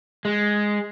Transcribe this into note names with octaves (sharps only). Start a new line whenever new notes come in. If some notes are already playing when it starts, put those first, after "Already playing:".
G#3